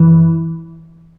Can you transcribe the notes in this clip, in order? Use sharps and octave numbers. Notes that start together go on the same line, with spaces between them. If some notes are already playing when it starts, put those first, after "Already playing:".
Already playing: F#2 E3